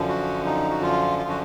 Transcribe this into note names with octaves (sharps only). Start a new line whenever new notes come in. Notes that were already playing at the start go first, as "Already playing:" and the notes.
Already playing: F#2 D3 F3
F#4
D#4
F#4
F4
F4
F#4